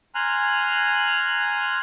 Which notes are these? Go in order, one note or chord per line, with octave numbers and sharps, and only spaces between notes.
G#5 A#5 C6 F6 F#6